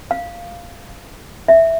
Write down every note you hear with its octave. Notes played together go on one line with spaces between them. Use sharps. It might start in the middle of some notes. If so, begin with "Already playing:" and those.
F5
E5